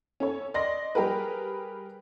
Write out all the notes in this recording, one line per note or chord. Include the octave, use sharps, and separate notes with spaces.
C#4 A4 C#5
D5 D#5 C6 A#6
G3 G4 G#4 A#4 B4